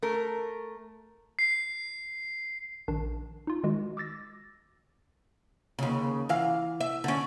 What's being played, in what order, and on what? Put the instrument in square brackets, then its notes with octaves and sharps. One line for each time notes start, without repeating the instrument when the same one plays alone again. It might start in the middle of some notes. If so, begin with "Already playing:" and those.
[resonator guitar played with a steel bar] A3 A#4
[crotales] C7
[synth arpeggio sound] A#1 D#3 D4
D#4 F4
D#3 G#3 F#4
D6 E6 A6 A#6
[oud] D#2 C#3
E3 F5
E5
D3 C#4